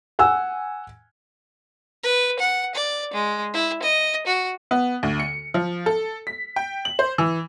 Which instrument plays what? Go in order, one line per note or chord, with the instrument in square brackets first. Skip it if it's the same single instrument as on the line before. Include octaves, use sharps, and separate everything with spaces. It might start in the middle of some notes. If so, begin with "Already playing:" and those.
[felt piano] F#5 G#5 E6
[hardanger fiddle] B4
F#5
D5
G#3
E4
D#5
F#4
[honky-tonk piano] B3
D2
C#7
F3
A4
B6
G5
F#7
C5
E3